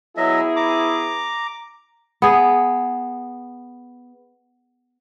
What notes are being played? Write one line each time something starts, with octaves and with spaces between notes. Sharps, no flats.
F#3 B3 E4 G#4 D#5 E5
A#5 D6
B3 G#4